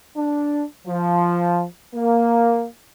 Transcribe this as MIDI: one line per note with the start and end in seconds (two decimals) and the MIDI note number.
0.16 0.63 62
0.86 1.63 53
1.95 2.65 58